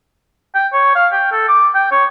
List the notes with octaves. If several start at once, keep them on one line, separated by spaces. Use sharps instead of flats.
G5
C#5
F5
G5
A4
D6
G5
C#5